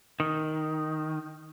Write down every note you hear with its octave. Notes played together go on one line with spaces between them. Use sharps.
D#3